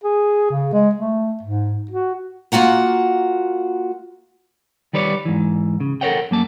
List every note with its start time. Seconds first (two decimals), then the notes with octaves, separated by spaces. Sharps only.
0.03 G#4
0.51 C#3
0.73 G#3
0.95 A3
1.42 G#2
1.91 F#4
2.52 A#3 F4 F#4 F#5 A#5
4.93 D#3 G3 B4 C#5 D5
5.25 G#2 E3
5.80 C#3
6.01 A4 A#4 C5 C#5 F#5 G5
6.31 F#2 A#3 A5